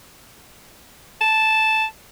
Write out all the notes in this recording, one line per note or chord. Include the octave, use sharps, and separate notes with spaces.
A5